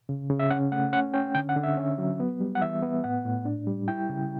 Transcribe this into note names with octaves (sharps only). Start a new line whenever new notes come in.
C#3
C#3
E5
C#4 F#5
A3 F#5
C#4 F#5
C#4 G5
D3 G5
F#5
D3
E5
C#4
F#3
B3
G3
F#5
E3 E5
B3
A2 F#5
A2
D4
G3
E4 G5
C#3